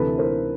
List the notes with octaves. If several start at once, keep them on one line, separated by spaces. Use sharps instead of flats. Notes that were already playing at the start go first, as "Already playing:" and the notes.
Already playing: D2 C3 E3 A4 B4
A#4 C5